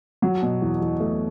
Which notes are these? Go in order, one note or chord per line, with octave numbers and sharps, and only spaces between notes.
F#3
B2
E2
E2
A3